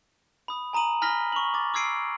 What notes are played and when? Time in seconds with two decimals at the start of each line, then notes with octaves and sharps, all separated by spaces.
0.48 B5 D#6
0.73 G#5 A#5 D#6 D#7 F#7
1.01 G#5 B5 F6 A#6 B6 G7
1.32 C#6 F7 F#7
1.54 D6 A6
1.74 D6 E6 G#6 C7 D7 D#7